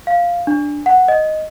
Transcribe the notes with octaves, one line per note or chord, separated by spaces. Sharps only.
F5
D4
F#5
D#5